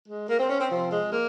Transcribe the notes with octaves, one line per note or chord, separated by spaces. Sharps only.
G#3
A#3
C4
C#4
C4
C3 F3 C4
G#3
A#3